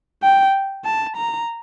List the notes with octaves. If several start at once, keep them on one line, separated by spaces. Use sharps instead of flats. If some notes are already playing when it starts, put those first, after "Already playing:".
G5
A5
A#5